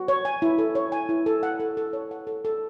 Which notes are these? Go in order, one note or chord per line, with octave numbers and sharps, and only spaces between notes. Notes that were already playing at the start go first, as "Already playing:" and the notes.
Already playing: F#4
C#5
G#5
E4
A4
C#5
G#5
E4
A4
F#5
A4
A4
C#5
F#5
A4
A4